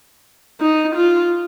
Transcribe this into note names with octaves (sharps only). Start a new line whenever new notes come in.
D#4
F4